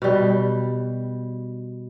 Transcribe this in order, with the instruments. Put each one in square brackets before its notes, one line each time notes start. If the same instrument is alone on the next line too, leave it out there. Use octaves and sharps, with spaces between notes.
[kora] B2 G3